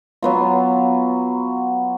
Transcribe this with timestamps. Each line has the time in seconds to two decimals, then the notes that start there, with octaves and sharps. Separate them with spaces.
0.23 F#3 B3 F4